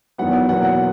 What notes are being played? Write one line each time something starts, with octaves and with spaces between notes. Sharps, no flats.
E2 D#3 F#3 B3 F#5
E2 B2 F#3 A#3 F#5
F#5